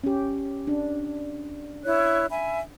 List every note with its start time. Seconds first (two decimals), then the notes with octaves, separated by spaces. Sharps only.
0.04 C#4 G4
0.67 D4
1.84 E4 C#5 F#6
2.29 E5 G#5 B5